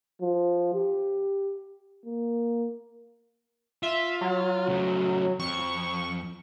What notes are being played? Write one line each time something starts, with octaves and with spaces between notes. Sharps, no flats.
F3
G4
A#3
F4 E5
F#3
C#3 A3
F2 C#6